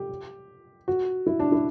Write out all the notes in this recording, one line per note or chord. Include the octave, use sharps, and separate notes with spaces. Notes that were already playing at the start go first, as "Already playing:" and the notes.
Already playing: G4
F#4
E4
D4
E4